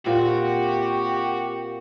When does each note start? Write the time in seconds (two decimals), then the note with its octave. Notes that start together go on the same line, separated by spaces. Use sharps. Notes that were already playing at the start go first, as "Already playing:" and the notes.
0.06 A#2 C4 F#4 G4 A#4 F5 F#5